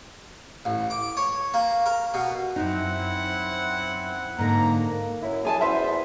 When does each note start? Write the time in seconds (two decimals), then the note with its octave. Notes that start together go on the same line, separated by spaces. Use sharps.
0.65 A1
0.90 D6
1.17 C#5
1.54 A#3
1.86 A#4
2.14 B2
2.56 F#2 C4 D#4 E4 F#5
4.39 G#2 D3 A#3 A#5
5.22 F#2 E4
5.45 G#4 G#5 A5
5.61 E2 C5 E5 B5